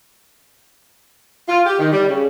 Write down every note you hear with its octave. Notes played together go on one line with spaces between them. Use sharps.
F4
G4
D#3
G3
C#3